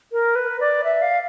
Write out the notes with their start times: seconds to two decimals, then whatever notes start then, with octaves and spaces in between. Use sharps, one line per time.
0.12 A#4
0.36 B4
0.60 D5
0.84 E5
1.02 F5